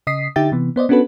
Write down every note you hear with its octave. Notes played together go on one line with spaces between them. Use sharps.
C#3 D#5 D#6 B6 C7
D3 D#4 G4 E5 G5 A6
C3 E3 B3
B3 C5 D5 D#5
B3 C#4 D4 F#4 A4 B4